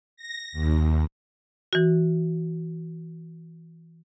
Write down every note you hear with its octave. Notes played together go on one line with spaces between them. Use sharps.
A#6
D#2
E3 F#4